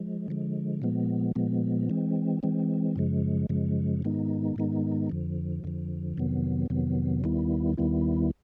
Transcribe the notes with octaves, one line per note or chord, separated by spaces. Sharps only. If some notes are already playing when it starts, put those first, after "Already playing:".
Already playing: F3 G#3
D3 F3 G#3
A#2 F3 G#3 B3
A#2 F3 G#3 B3
E3 G#3 C4
E3 G#3 C4
F#2 C#3 F3 G#3
F#2 C#3 F3 G#3
G#2 D#3 G#3 B3 D#4
G#2 D#3 G#3 B3 D#4
F2 D3 F3
F2 D3 F3
F2 C3 D#3 F#3 B3
F2 C3 D#3 F#3 B3
D#2 D#3 G3 B3 E4
D#2 D#3 G3 B3 E4